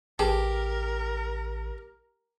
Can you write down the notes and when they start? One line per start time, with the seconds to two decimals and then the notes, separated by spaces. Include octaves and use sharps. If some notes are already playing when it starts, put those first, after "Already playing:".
0.19 A1 G4 G#4 A#4 B4 A5